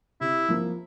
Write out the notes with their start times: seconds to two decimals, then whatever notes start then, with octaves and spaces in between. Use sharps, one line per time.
0.21 C3 E4
0.48 F3 A#3